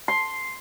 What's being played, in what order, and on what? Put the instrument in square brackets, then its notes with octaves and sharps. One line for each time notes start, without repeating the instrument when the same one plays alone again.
[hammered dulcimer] C6